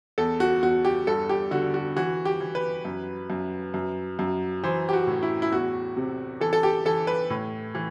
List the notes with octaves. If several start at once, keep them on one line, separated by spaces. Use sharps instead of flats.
E2 A4
F#4
E2 F#4
G4
G2 A4
G4
D3 F#4
F#4
E3 F#4
G4
E3
B4
F#2
F#2
F#2
F#2
E3 C5
G4
F#4
A2
E4
E4
E2 F#4
C3
E3 A4
A4
G4
E3 A4
B4
A2
E3